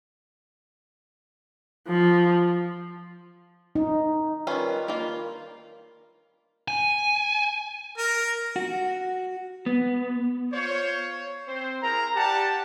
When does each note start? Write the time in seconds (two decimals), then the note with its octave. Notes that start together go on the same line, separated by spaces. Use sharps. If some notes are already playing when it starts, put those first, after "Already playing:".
1.89 F3
3.75 D#4
4.47 D#3 G3 C#4 F4 B4
4.88 A#3 F4
6.68 G#5
7.98 A#4
8.56 F#4
9.66 B3
10.53 F4 C5 C#5
11.47 C4 C5
11.83 E4 G#4 A#4 A#5
12.16 G4 D5 F#5 A5